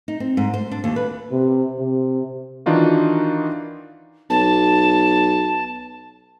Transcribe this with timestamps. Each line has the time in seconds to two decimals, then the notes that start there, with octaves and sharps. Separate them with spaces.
0.08 D#4
0.20 C4
0.37 G#2
0.54 C5
0.71 D4
0.84 D#2
0.96 B4
1.31 C3
1.79 C3
2.66 D#3 E3 D4 D#4 F4 F#4
4.30 B1 A5